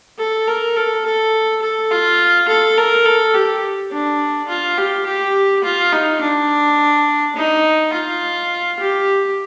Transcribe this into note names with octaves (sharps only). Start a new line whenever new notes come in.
A4
A#4
A4
A4
A4
F4
A4
A#4
A4
G4
D4
F4
G4
G4
F4
D#4
D4
D#4
F4
G4